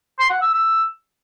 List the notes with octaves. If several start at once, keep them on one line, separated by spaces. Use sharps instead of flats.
C6
F#5
E6
E6